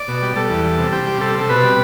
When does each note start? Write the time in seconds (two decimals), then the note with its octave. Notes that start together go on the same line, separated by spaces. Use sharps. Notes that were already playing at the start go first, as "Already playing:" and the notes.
Already playing: D5
0.08 B2
0.22 G3
0.36 G3 A4
0.50 E2
0.65 G3
0.79 C3
0.92 C3 G4
1.07 G3
1.21 C3 A4
1.35 C3 A4
1.49 B2 B4
1.63 G3